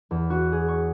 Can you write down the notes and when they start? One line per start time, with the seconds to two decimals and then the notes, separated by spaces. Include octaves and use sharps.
0.11 E2
0.30 F#4
0.52 G#4
0.68 C#6